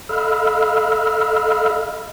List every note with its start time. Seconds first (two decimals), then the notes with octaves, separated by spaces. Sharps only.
0.09 A4 D#5 F5 B5 E6 F6